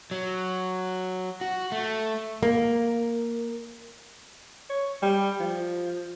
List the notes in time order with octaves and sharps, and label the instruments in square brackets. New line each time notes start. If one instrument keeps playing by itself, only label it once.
[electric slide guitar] F#3
F#4
A3
[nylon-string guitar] A#3
[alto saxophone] C#5
G3
F3